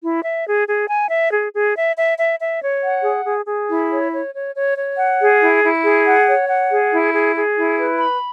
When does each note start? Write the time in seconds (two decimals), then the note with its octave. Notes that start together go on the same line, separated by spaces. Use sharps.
0.02 E4
0.24 E5
0.46 G#4
0.68 G#4
0.88 G#5
1.10 E5
1.32 G#4
1.53 G#4
1.75 E5
1.96 E5
2.18 E5
2.39 E5
2.61 C#5
2.83 F#5
3.04 G#4
3.25 G#4
3.47 G#4
3.69 E4
3.91 C#5
4.12 C#5
4.33 C#5
4.55 C#5
4.76 C#5
4.98 F#5
5.20 G#4
5.41 E4
5.63 E4
5.84 G#4
6.06 F#5
6.27 C#5
6.48 F#5
6.71 G#4
6.91 E4
7.14 G#4
7.35 G#4
7.57 E4
7.78 B4
7.99 B5